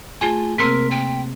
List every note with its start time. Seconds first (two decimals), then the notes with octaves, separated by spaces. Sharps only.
0.21 A3 F4 G#4 G#5
0.58 C3 A#3 C4 A#4 C6 B6
0.91 G5